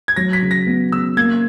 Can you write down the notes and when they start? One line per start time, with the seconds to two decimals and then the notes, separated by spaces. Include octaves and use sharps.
0.08 G#6
0.16 F#3 A#6
0.33 B6
0.42 C#3
0.51 A#6
0.67 B3
0.92 C#3 E6
1.17 A#3 G#6